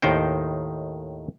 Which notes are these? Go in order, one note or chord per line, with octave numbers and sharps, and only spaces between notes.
D#2 A2 D#3 D#4 C5 G5